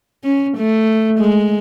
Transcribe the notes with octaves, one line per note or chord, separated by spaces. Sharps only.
C#4
A3
G#3